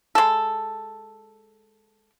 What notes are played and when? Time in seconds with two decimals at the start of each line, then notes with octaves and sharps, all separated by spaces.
0.15 G#3 A4